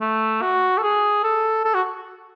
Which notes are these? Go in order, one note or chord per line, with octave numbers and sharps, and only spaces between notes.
A3
F#4
A4
G#4
A4
A4
F#4